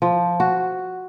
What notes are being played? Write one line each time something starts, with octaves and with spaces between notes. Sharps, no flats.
F3
F#4